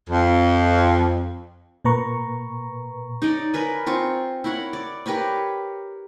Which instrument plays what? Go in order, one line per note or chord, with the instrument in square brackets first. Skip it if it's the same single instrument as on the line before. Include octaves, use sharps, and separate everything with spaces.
[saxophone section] F2
[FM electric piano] A#2 A#3 B4 A#5 C#6
[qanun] D#4 C#5 D5
A#4 B4 G#5
C4 F4 C#6
E4 A#4 C#5 F#5
D5
G4 A#4 B4 C#5